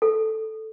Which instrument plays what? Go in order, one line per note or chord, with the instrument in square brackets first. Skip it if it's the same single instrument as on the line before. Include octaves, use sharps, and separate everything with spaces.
[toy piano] A4